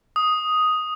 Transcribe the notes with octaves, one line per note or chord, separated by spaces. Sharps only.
D#6